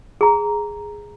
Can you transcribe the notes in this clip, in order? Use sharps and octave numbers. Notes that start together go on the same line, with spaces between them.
G#4 A#5